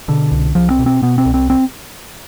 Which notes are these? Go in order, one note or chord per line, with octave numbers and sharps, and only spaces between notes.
B2 D3
C2
C2 F3
C4
B2
C4
B2 B3
C4
C2
C4
C4